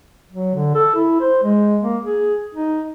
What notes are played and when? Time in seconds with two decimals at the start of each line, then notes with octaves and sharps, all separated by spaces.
0.32 F#3
0.55 D3
0.75 A4
0.95 E4
1.20 C5
1.43 G#3
1.83 A#3
2.04 G#4
2.55 D#4